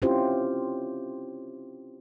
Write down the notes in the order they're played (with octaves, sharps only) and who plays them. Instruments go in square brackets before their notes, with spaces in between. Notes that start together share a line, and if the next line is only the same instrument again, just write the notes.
[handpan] C4 C#4 E4 F4 G4 C5